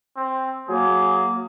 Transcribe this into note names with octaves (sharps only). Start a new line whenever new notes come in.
C4
F#3 A#3 G#4